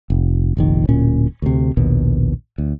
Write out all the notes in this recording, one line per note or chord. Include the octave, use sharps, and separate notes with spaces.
F1
F1 A#1 D#3
D1 A#2 C#4
D2 C3
A#1 D#2 B2
D2